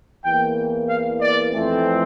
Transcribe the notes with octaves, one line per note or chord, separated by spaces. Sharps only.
E2 E3 A#3 G5
F5
D5
F2 E3 A3 C4